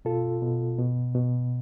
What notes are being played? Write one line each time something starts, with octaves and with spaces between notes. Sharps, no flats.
B2 F4 A4
B2
B2
B2